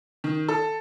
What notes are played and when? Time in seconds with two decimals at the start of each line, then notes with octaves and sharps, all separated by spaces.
0.24 D#3
0.48 A4